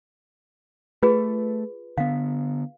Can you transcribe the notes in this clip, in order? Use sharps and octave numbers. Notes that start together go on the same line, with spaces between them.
A3 F4 G#4 B4
D3 B3 F5